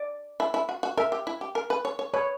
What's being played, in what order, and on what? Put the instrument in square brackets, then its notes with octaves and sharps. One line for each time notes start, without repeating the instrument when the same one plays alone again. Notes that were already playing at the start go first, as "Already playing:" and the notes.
Already playing: [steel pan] D5
[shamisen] E4
E4
F#4
F#4
[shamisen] A#4 [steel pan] E5
[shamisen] G4
E4
G4
A#4
B4
C#5
C#5
[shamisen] B4 [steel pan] C#5